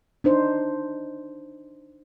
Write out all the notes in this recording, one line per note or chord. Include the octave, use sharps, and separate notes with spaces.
D4 D#4 C5